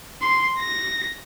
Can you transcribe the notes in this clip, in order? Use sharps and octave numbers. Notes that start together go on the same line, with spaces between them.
C6
A#6